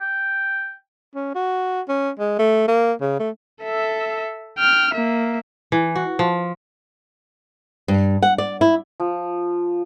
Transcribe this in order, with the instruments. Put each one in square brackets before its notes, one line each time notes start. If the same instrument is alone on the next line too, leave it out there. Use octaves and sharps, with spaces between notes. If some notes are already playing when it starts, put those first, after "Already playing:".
[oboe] G5
[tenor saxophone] C#4
F#4
C#4
G#3
A3
A#3
C#3
A3
[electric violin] A4 E5
G5 F6
A#3 E5
[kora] E3
F#4
F3
[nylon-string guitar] G2
F#5
D5
E4
[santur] F3